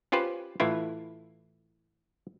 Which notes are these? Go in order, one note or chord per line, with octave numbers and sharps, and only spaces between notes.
C#4 F4 G4 B4 C5
A2 E3 E4 F4